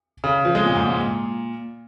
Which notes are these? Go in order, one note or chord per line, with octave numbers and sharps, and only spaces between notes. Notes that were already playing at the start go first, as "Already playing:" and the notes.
C#3
F3
G#3
A#2
G#2
A#2